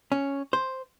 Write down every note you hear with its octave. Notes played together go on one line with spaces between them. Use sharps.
C#4
C5